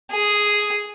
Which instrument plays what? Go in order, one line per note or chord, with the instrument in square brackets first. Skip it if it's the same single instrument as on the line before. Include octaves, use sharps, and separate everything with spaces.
[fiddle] G#4